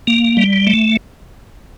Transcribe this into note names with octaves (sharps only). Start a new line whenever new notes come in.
A#3
G3
A3